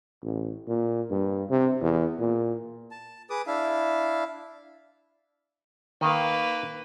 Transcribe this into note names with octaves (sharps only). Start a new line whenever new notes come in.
A1
A#2
G2
C3
E2
A#2
A5
G#4 B4 D6 D#6
D4 E4 E5 F5
D#3 A#3 B4